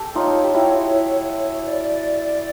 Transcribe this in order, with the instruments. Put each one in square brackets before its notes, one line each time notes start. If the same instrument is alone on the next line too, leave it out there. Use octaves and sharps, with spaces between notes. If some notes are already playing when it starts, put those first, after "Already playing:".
Already playing: [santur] G4 A4
[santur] D#4 F4 [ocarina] C#5
[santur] G4
E4 F#4
[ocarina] D5